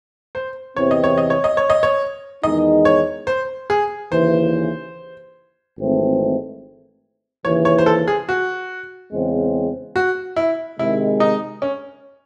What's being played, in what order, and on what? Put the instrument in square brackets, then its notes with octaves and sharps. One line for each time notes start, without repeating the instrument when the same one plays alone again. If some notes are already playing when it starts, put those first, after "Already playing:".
[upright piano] C5
[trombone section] E2 C3 E3 C4 [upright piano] C#5
[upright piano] D#5
C#5
D#5
C#5
D#5
C#5
D#5
C#5
[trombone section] E2 D#3 G#3 D#4 [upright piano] D#5
[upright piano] C#5
C5
G#4
[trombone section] D#2 C#3 E3 [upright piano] C5
[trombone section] G#1 G#2 E3 A3 C4
[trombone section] D#2 C#3 E3 [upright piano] C#5
[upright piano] C#5
C5
A4
G#4
F#4
[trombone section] E2 C#3 G#3 C4
[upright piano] F#4
E4
[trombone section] C3 D#3 G#3 [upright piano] E4
[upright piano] D#4
C#4